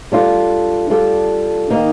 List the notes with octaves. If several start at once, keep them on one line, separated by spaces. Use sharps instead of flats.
G3 D4 F4 A4
G3 D4 F4 A4
D#3 A#3 D#4